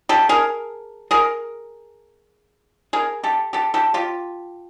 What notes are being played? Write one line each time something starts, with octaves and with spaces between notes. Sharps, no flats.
G4 A4
G#4 A#4
G#4 A#4
G#4 A#4
G4 A4
G4 A4
G4 A4
F4 G4